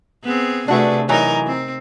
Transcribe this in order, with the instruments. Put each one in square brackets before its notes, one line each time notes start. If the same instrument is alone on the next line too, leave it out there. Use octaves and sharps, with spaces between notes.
[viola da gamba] B3 C4 G#4
[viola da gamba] C3 A3 G#4 [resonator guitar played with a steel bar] D4 F#4 B4
[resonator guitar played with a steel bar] E3 F#3 [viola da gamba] D#4 A#4
[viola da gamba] C4